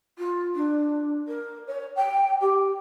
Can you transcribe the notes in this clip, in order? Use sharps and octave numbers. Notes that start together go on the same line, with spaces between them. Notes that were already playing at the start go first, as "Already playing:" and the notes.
F4
D4
A#4
C#5
G5
G4